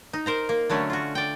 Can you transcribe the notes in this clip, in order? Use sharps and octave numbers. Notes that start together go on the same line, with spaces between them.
D#4
A#4 C5 A#5
A#3
D3 F#3 A3 C#4
F4 F#4
D5 G5